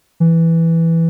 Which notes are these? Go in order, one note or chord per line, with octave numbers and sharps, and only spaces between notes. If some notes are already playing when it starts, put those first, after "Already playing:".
E3